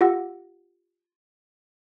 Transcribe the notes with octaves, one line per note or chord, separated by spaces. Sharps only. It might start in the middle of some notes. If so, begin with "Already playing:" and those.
F4 G4 F5 F#5 E6 A#6